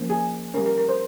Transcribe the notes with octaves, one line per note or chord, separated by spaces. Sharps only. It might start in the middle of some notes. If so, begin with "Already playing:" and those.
Already playing: F3 A#3 C#4
G#4
G3 C#4 A#4
A#4
A#4
C5